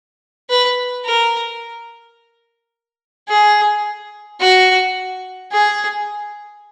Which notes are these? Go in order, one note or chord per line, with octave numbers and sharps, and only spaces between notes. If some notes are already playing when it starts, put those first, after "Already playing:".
B4
A#4
G#4
F#4
G#4